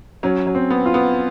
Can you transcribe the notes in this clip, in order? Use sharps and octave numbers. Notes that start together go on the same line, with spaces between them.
F#3 C#4
F#3
C4
B3
F4
B3